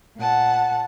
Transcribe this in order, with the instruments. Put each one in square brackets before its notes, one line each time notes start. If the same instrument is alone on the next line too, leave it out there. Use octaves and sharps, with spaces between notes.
[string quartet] A#2 F#5 A5